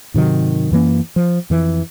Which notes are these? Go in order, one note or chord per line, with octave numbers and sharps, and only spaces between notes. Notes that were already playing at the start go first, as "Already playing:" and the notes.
G#2 C3 D#3 F#3
F#2 E3 A#3 C#4
F3
F2 E3